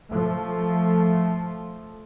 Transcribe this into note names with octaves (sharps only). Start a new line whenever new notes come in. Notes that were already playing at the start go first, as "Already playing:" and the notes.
F3 A3